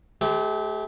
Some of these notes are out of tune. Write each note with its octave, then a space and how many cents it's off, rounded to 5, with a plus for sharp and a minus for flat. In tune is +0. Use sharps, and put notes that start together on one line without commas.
A3 -45 G4 +0 C5 -45